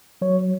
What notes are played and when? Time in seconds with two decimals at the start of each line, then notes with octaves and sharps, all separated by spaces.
0.21 F#3 C#5